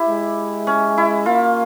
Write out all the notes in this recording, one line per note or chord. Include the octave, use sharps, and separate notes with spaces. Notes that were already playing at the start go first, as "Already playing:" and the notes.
Already playing: E4 G4
G#3
C#4
E4
A#3 F4